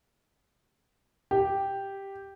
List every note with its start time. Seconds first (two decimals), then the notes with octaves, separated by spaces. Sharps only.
1.31 G4